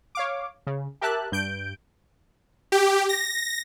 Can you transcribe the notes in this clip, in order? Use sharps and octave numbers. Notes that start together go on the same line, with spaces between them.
C#5 F5 D6
C#3
G4 A#4 E5 A5 F#6
G2 G6 D7
G4
A#6